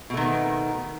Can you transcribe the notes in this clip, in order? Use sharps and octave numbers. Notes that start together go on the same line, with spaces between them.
B2 D#3 A3 B3